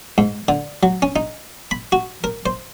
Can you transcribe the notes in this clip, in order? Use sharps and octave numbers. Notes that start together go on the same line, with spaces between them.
G#2
D3
F#3
C#4
D#4
B5
F#4
A#4
C5